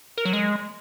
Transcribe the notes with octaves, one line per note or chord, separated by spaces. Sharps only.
A#4
F#3
G#3